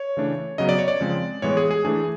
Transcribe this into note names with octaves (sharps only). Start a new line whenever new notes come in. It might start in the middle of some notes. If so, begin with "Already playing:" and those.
Already playing: C#5
C#3 E3 A3 D4
C#3 F#3 B3 D#5
D5
C#5
D5
C#3 F3 G#3 C4
A2 E3 G#3 B3 C#5
G#4
G#4
E3 A3 D4 G#4